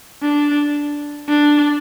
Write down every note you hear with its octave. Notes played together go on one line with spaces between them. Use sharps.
D4
D4